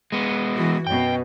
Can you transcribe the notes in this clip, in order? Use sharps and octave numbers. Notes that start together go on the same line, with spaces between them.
G#3 B3
E3 F#4
F#2 B2 G5